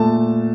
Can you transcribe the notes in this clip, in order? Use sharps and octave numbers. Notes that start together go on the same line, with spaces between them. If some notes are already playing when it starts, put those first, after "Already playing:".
Already playing: A#2 A3 A5